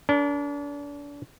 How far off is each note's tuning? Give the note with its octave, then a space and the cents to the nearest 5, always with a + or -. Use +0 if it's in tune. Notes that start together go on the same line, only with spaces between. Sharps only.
D4 -35 A#4 +0